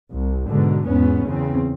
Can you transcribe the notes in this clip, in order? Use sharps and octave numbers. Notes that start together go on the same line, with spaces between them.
C2
G#2 B2 D3
E2 G#2 B3 C#4
E2 C#3 C4